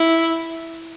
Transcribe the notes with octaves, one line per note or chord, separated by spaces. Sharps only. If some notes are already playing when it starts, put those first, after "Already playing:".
Already playing: E4